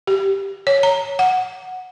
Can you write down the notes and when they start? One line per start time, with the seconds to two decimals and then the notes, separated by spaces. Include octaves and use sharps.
0.07 G4
0.67 C#5
0.83 A#5
1.19 F#5